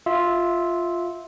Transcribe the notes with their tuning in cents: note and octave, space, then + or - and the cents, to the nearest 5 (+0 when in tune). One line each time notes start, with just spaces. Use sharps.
F4 +0 E5 -15